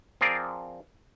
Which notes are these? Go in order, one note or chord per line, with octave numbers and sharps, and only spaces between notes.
F3 C4 G#4 A#4 D5